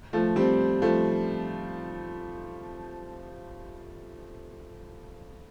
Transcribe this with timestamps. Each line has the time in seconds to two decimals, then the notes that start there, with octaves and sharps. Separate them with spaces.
0.13 F3 A3
0.36 G3 C4
0.82 F3 A3